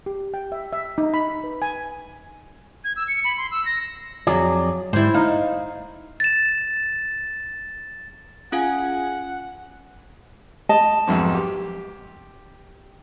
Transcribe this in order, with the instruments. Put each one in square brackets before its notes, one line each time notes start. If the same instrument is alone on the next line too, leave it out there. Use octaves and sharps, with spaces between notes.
[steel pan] G4
G5
E5
E5
D#4
B5
B4
G#5
[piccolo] G#6
E6
C#7
B5
C6
E6
A#6
[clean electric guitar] F2 G#4 D5 [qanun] F#3
[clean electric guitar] G#2 G3 [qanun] E4 C5
[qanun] D#4 [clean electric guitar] F5
[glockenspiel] A6 E7
[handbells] C#4 F4 F5 [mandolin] G#4 [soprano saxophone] F#5
[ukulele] D#5 A5
[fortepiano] B1 F2 G#2
G4